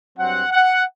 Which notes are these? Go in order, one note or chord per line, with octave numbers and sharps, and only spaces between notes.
G2 F#3 C4 F#5
F#5